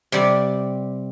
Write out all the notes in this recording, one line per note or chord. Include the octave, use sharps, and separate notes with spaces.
C3 G3 D5